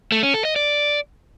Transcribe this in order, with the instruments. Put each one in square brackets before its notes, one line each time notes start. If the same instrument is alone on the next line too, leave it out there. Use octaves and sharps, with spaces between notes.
[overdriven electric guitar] A3
C#4
A4
D#5
D5